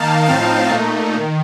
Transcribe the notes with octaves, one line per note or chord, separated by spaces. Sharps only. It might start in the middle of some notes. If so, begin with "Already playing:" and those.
Already playing: D#3 A#3 D#4 F5 A5
A2 F3 C4 D#4 F5 A5
A#2 A3 D#4
D#3